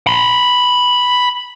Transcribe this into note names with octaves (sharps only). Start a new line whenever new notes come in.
B5 C6